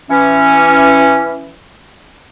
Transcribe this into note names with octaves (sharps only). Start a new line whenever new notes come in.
E3 C#4